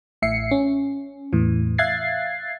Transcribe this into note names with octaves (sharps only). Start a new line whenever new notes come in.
A1 A2 E5 C7 C#7
C#4
E2 A2 E3
E5 F5 F#6 G#6 A6 C7